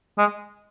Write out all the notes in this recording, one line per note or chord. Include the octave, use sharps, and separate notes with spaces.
G#3